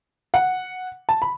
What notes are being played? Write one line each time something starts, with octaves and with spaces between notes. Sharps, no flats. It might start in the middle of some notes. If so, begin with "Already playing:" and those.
F#5
A5
B5